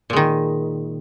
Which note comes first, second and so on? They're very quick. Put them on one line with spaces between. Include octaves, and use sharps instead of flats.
A#2 G#3 D#3